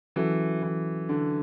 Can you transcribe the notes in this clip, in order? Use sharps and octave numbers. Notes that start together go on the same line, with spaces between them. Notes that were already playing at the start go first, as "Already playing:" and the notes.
E3 F#3 C#4 F#4 A4
E3
D3